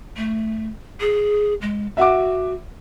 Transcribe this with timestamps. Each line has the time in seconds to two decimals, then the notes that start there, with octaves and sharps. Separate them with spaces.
0.17 A3
1.00 G#4
1.62 G#3
1.97 F#4 E5 F#5 D6